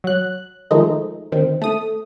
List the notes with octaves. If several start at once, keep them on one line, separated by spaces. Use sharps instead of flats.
F#3 F#6
D#3 F3 G#3 A3 D#4
D2 D#3 C4
A3 D#6